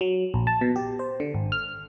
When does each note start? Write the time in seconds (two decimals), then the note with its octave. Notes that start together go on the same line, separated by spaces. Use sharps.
0.01 F#3
0.34 A#1
0.47 A5
0.61 B2
0.76 G4
0.99 C5
1.20 D3
1.34 G#1
1.52 F6